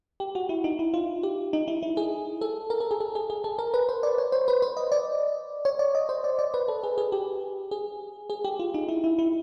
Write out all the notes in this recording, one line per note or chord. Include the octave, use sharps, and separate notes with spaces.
G4
F#4
E4
D#4
E4
F4
G4
D#4
E4
E4
G#4
A4
A#4
A4
G#4
A4
G#4
G#4
A4
A#4
B4
C5
D5
C#5
C5
B4
C5
D#5
D5
C#5
D5
D#5
C5
D5
D5
B4
A4
G#4
G#4
G4
G#4
G#4
G4
F4
D#4
E4
E4
E4